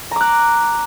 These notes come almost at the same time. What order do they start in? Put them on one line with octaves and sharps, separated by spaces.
A#5 D6 F#6